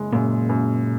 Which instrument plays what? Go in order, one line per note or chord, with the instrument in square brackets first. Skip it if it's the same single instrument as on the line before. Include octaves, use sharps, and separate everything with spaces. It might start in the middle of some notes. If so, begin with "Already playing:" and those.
Already playing: [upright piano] F#1 G#3
[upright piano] F#2 [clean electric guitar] A#2
[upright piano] F#2